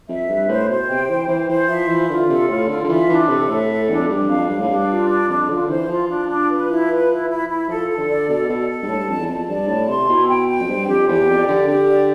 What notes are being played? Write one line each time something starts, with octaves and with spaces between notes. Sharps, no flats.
F2 E5
G2 B4
A2 C5
B2 C5
C3 G5
E3 C5
E3 C5
E3 C5
F3 E5
E3 F4
D3 F4
C3 A4
A2 F4
D3 F4
D3
E3 E5
E3 D4
C3 A4
A2 E5
A4
E2 D4
F2
G2 D4
F2 F5
G2 F5
A2
G2 D4
F4
D4
F2 D4
D3 F4
E3 C5
F3 F4
D4
D4
B4
E4
B4
E4
E4
E4
F3 A4
A4
D3
D5
B2 A4
B2 A4
A4
G2
A2 A5
G2
F2 A5
E2
F2 A5
G2 D5
A2 A5
C3 C6
B2 E4
G5
G5
F2
G2 C5
F2 G4
E2 G4
F2 D5
D3 G4
D3 G4
D5